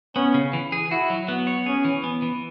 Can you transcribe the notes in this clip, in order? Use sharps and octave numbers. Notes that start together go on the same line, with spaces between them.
B3 C#4
C#3
E3
G#4
E4 F#4
F#3
B3
C#5
C#4 G#4
E3
B3
E3